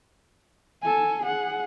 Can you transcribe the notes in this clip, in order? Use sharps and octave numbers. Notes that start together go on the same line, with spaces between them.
A4 G#5
G#4 F#5